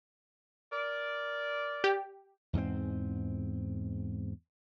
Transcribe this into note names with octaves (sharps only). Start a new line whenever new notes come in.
A#4 D5
G4
E2 G#2 G#3 C4